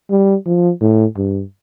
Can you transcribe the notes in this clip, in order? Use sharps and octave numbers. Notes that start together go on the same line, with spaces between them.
G3
F3
A2
G2